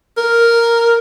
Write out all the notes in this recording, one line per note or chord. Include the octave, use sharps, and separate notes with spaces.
A#4